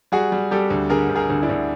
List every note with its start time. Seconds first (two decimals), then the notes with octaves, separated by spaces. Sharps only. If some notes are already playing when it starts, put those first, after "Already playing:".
0.12 G3 F#4 G#4
0.32 G3
0.51 G3 G4 A4
0.70 D2
0.90 D3 G#4 A#4
1.09 D2
1.16 G#4 A#4
1.30 D2
1.42 D4 E4
1.49 D2